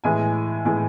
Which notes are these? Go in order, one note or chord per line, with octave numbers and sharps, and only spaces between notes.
A2 E3 G#3 G#5
A2 E3 G#3